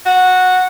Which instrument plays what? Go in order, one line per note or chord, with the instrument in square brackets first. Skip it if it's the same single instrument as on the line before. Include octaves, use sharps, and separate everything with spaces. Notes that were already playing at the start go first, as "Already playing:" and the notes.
[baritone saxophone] F#4